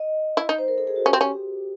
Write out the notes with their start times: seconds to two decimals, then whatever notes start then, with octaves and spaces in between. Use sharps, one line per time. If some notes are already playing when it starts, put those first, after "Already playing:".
Already playing: D#5
0.37 E4
0.49 D#4
0.58 C5
0.68 A#4
0.78 A4
0.87 G#4
0.96 F#4
1.06 C#4 G4
1.13 C4
1.20 C#4 G4